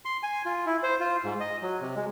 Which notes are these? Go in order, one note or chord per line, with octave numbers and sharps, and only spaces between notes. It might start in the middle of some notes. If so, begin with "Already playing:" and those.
C6
G#5
F4
E4
C5
F4
G#2
D#5
F#3
C3
G#3